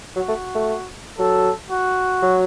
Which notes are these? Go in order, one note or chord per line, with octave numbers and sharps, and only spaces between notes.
F#3 F#4
A3
A3
F#3 A4
F#4
F#3